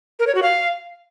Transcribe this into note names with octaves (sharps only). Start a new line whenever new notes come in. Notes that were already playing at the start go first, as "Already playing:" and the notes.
A#4
C#5
F#4
F5